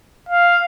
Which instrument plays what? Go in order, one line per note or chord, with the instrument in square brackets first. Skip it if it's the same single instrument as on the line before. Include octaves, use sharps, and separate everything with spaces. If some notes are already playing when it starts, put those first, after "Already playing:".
[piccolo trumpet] F5